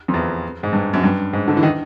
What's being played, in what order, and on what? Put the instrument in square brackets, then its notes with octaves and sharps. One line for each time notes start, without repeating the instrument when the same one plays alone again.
[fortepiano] F2
E2
G#2
G2
F#2
G2
G#2
D3
E3
D#3